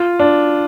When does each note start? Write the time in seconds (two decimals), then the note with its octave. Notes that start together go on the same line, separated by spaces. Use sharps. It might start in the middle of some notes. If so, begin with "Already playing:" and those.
Already playing: F4
0.19 D4